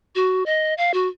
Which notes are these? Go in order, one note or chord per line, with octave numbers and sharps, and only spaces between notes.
F#4
D#5
F5
F#4